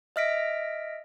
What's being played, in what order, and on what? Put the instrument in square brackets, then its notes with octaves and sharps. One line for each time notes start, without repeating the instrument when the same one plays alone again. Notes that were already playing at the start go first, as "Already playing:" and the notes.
[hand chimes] D#5 E5 F6 A#6 B6 D7